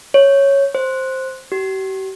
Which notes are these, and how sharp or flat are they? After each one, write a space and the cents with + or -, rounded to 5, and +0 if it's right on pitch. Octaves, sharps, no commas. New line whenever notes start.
C#5 -5
C5 +5
G4 -45